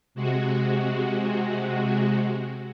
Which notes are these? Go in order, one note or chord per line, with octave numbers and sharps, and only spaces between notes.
C3 G#3 F#4